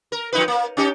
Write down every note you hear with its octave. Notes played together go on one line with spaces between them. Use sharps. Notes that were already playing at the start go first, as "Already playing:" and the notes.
A#4
F3 D#4 B4
A#3
C#4 D#4 G4